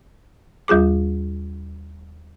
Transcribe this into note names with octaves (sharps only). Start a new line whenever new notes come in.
D#2 G3 F4 G#4 D6